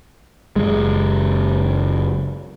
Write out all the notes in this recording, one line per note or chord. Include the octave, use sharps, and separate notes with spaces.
F#1 C2 G#3